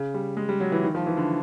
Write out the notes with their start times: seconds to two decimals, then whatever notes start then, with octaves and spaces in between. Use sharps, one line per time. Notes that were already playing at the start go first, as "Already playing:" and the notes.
Already playing: C#3
0.14 G3
0.37 G#3
0.49 G3
0.60 F#3
0.72 E3
0.83 D#3
0.95 F3
1.06 E3
1.17 D3